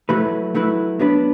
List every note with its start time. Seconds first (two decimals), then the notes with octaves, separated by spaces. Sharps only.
0.09 F#3 A3 E4 B4
0.54 F#3 A3 E4 B4
0.99 F#3 B3 D4 B4